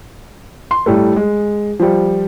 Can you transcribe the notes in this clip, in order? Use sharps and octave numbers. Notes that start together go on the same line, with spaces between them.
C6
A2 G3 A3
G#3
F3 G3